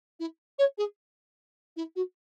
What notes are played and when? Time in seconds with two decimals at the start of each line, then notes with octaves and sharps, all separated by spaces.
0.20 E4
0.59 C#5
0.78 G#4
1.76 E4
1.96 F#4